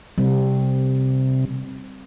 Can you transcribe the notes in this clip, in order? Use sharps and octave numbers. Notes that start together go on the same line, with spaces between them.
C3 G3 C4